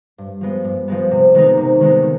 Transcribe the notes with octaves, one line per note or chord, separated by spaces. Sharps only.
G2
F3 G#3 B3
G2
F3 G#3 B3
C3
D#3 G#3 B3 D#4
C3
D#3 G#3 B3 D#4
D#3